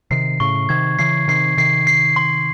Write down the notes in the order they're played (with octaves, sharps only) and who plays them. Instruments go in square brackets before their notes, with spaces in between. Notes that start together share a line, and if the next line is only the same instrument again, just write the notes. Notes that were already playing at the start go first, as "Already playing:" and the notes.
[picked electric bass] C3 D#3 [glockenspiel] C7
[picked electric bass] A2 C#3 [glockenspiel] C#6
[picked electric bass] C3 D#3 [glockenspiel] G#6
[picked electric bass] C#3 E3 [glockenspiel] C7
[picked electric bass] C3 D#3 [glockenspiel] C7
[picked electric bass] C3 D#3 [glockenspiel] C7
[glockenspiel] C7
C6